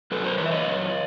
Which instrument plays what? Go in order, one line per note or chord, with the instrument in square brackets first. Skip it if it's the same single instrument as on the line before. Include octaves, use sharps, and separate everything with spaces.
[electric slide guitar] F#2 A4 B4
A#4 C5
E3 B4 C#5
E5
C#5 D#5
F#2